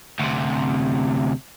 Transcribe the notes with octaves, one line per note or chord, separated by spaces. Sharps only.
D2 C3